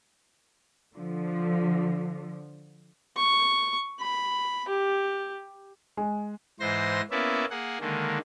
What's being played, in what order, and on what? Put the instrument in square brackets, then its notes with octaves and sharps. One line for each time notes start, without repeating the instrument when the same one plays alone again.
[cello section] D3 F3
[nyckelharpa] C#6
B5
G4
[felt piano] G#3
[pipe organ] G#2 E3 C5 C6 A#6
A#3 B3 C#4 E4 D5 E5
A#3 G#4 F#5
D3 D#3 G#3 A#3